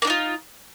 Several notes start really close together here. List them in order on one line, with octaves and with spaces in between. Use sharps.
A#3 D4 D#4 F4